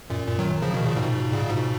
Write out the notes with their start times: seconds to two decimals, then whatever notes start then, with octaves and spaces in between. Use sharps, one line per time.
0.10 F#2 A#2
0.27 F#2 A#2
0.39 D#3 F#3
0.62 C#3 F3
0.74 B2 D#3
0.85 A#2 C#3
0.97 G#2 B2
1.32 A#2 C#3
1.49 G#2 B2